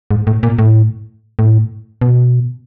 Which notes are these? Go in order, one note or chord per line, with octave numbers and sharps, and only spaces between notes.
G#2
A2
A#2
A2
A2
B2